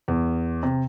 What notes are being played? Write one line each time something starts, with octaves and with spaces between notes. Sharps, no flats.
E2
C3